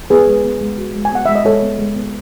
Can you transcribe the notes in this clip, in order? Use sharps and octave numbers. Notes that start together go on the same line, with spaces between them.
B3 G#4 B4
G#3
B3
G#3
F#4
G#3
G#5
B3 F#5
G#3 E5
D#5
G#3 A4 C#5
B3
G#3
B3